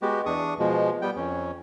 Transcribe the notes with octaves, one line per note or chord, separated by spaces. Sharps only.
G#3 B3 F#4 G4
E2 D4 C#6 D#6
B2 F3 G#3
G3 B3 G5
F2 C#4